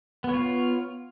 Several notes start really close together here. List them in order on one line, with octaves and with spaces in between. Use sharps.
B3 C#5 F4